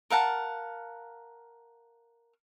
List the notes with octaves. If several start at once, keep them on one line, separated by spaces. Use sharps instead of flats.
A#4 F5 F#5 A5